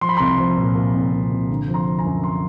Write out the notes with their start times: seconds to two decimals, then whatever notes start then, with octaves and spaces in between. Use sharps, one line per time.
0.01 F3 C6
0.09 B5
0.17 C2 A#5 C6
0.38 F3
0.57 A#2
0.75 A#2
0.94 C2
1.12 C2
1.31 C2
1.50 D3
1.68 F3
1.74 A#5 C6
1.86 F3
1.99 G#5 A#5
2.05 F#2
2.24 A#5 C6